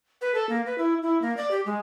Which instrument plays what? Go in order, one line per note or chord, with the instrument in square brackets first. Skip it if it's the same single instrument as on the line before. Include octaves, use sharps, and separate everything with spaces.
[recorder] B4
A4
A#3
B4
E4
E4
A#3
D5
G4
G#3